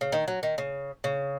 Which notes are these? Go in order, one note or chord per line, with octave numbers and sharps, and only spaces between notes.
C#3
D#3
F#3
D#3
C#3
C#3